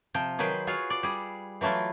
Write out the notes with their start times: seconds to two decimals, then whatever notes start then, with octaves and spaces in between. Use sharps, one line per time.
0.14 C3 F3 G5
0.39 D#3 F#3 G#4 B4 C5 G5
0.67 F4 F#4 G#4 C#5 F5
0.90 D5
1.03 G3 G#4
1.61 E3 F#3 A3 E4 F4